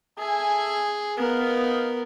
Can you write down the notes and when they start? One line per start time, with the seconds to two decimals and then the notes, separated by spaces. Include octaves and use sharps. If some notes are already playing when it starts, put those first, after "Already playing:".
0.18 G#4 A4 E5 G#5
1.18 B3 D#4 A#4 F5